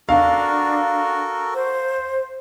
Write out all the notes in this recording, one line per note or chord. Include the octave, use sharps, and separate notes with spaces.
D4 F#4 A4 A#4 F5
C5